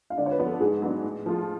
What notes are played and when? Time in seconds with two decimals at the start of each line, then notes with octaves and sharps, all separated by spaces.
0.10 F5
0.18 D3 D5
0.26 C#5
0.31 B4
0.38 F3 B3 D4
0.46 A4
0.60 G#2 G#4
0.82 F#3 B3 D4
1.04 A2
1.26 F3 A3 F4